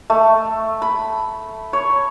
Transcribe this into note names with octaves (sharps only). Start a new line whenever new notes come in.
A3
B5
C#5